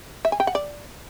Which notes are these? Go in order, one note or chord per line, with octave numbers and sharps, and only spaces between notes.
E5
G#5
G5
F#5
D5